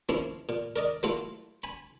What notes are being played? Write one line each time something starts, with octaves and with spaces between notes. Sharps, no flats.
F3 A#3 C#4 E4
A#2
A#4 D5 D#5
F#3 A3 A#3 E4 F4
G#5 B5